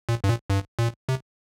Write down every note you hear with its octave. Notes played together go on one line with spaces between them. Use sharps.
A#2
G2
A#2
G2
A#2
C3